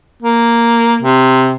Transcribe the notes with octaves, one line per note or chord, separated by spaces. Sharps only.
A#3
C3